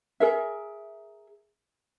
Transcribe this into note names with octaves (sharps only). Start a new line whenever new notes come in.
G#4 A#4 E5